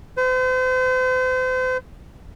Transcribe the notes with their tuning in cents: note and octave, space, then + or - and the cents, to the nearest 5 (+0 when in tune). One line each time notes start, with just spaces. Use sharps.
C5 -40